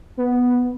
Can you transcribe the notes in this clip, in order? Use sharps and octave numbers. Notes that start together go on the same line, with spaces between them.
B3